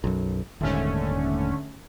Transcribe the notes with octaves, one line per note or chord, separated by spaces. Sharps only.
B1 F#2
D#1 D#2 G#2 D3 A3 C#4